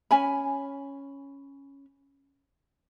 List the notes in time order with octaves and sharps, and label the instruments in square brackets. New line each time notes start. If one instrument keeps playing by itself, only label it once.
[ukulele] C#4 G#5 B5